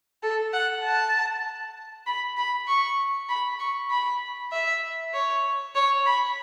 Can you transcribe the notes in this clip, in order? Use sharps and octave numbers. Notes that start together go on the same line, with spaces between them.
A4
F#5
A5
B5
B5
C#6
B5
C#6
B5
E5
C#5
C#5
B5